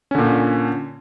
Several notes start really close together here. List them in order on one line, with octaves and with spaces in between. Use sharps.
C#4 D3 A#2